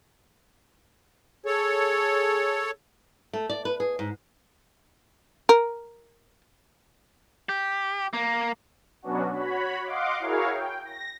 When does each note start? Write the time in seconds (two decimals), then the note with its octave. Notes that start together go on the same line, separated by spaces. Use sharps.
1.46 G#4 A4 C#5
3.33 A3
3.50 D5
3.65 B4
3.80 G#4
3.99 G#2
5.49 A#4
7.49 G4
8.13 A#3
9.02 B2 F#3 B3 C#4 D4 F#4
9.34 F#4 C#5 B5
9.84 D#5 F5 F#5 C6 D6
10.20 E4 F#4 G#4 A#4 C#5 F5
10.51 G5
10.85 A#6